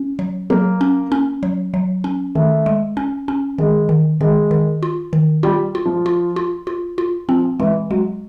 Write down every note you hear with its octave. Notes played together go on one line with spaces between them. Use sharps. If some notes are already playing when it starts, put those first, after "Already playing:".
Already playing: C#4
F#3
F#3 A#3
C#4
C#4
F#3
F#3
C#4
D#3 A3
G#3
C#4
C#4
D#3 G#3
D#3
D#3 G#3
D#3
F4
D#3
G3 F4
F4
F3
F4
F4
F4
F4
F3 C4
E3 G#3
F#3 G#3